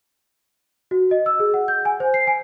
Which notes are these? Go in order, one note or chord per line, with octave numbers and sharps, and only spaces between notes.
F#4
D#5
E6
G#4
F#5
G6
G#5
C5
C7
G#5